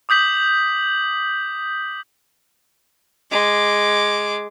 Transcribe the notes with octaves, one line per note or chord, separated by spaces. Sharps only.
D6 D#6 G6 B6 F#7
G#3 D6